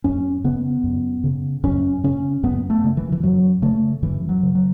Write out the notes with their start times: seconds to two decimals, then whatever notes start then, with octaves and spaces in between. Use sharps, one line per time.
0.04 F#2 C#4
0.44 C#3 B3
0.84 F#2
1.24 C#3
1.64 F#2 C#4
2.04 C#3 C#4
2.43 F#2 B3
2.70 A3
2.84 C#3
2.97 E3
3.12 E3
3.23 F#2 F#3
3.62 C#3 A3
4.02 F#2 E3
4.29 F#3
4.43 C#3
4.55 F#3